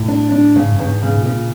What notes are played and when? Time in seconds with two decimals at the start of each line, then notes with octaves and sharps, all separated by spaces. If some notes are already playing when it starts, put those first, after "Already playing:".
Already playing: A2
0.08 D4
0.32 D4
0.56 G#2 C#3
0.71 G2
0.79 E2
0.86 G#2
1.02 G#2 C#3
1.17 A#2
1.25 C#3
1.33 A#2